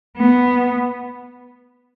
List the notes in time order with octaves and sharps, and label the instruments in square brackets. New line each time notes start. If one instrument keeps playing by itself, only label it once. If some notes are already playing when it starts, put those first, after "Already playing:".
[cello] B3